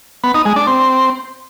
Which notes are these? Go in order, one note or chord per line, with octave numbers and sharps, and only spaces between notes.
B3
D#4
G#3
D4
C4